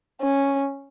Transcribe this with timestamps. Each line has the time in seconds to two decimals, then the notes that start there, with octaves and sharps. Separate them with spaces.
0.21 C#4